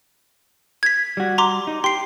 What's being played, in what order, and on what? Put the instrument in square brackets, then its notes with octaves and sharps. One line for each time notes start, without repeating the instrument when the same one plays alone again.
[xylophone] G#6 B6
[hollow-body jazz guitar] G3 F#4
[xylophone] A#5 C6 D6
[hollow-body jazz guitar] D#4
[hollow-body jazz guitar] G4 [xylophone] C6 C7